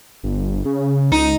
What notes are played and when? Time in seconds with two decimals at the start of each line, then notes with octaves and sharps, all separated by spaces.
0.23 G1
0.65 C#3
1.12 C#2 D#4